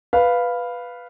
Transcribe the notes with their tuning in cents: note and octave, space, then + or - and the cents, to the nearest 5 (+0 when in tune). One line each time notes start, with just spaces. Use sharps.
B4 +0 F5 +0